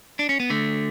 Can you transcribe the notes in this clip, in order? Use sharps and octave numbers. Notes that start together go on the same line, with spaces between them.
D4
C#4
B3
D3 A3